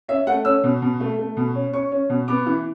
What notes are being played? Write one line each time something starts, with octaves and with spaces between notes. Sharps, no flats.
C#4 E5
A3 F#5
C#4 E6
B2
B2
A3
A3
B2
C#4
C#4 C#6
C#4
B2
B3 D6
E3